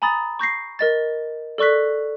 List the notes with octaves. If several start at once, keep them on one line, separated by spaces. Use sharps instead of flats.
G#5 A#5 B5 D#6 A6
C#6 G6 A#6 C7
A#4 D#5 A6
A4 D5 C#6 F#6 B6